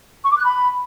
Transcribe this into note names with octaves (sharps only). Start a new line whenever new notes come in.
C#6
D6
F#6
B5